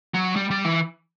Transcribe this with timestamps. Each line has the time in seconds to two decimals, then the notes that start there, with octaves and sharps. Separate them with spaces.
0.14 F#3
0.36 G3
0.51 G3
0.65 E3